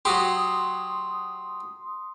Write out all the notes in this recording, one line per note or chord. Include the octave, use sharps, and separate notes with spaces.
F#3 F#4 G4 C6 D#6